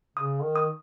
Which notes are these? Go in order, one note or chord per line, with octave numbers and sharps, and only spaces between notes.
C#3 D#6
D#3
D#6